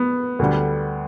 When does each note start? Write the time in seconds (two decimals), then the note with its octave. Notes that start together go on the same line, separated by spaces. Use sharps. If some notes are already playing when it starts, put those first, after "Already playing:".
Already playing: B3
0.39 D2 D3 G3